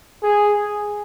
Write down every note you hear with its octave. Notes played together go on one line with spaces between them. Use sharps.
G#4